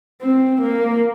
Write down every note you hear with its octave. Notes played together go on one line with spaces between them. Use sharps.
C4
A#3